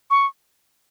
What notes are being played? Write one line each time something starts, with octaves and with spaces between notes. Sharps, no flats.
C#6